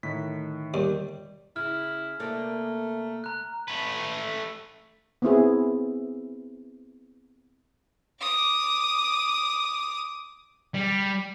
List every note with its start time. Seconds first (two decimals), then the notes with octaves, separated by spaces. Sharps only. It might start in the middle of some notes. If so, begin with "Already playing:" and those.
0.03 A2 D3 D#3 D#4 B6
0.74 D#2 G3
1.56 C#3 E4 F6
2.20 C3 A3 A#3 D5
3.24 A#5 F#6
3.68 A3 B4
5.22 B3 C4 E4 G#4
8.21 D6 D#6
10.74 G3